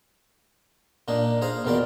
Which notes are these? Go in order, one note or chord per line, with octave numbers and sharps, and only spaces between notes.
A#2 A#3 D4 D#4
G#4 C5 F5 A#5
E2 B2 D#3 F4 A#4 D5